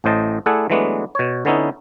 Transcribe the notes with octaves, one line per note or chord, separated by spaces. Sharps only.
A1 A2 C5 D#5 A5
A3 E4 G#4 A4 D5 F#5
E3 F#3 G#3 A3 B3 D4
B2 C#5
D3 B3 C#4 D#4 E4